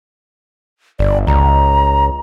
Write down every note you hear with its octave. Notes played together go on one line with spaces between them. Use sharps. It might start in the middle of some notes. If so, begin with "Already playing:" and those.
G1 D5
C#2 A#5